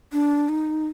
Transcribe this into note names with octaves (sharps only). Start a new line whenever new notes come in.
D4
D#4